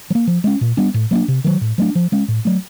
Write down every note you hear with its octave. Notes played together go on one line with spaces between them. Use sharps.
F#3
A#3
F3
G#3 C#4
A#2
G3 B3 D4
A2
F#3 A#3 D4
C3
D#3 F#3
A2
F#3 A3 D4
F3
G#3 C#4
A2
F#3 A3